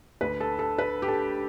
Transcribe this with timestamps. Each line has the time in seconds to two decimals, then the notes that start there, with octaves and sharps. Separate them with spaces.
0.21 D2 D3 B4
0.40 A4
0.59 A4
0.78 B4
1.02 G4
1.08 A4